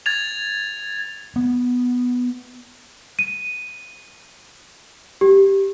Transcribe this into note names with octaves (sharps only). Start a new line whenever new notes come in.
G#6 A6 F7
B3
D#7
G4